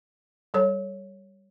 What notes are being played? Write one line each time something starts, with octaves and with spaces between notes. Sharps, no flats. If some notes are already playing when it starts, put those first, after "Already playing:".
G3 A4 C#5